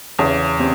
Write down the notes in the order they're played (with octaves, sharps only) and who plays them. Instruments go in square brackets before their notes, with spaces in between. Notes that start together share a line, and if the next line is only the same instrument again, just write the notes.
[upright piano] E2 [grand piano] C#3 C#4
[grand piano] C3 C4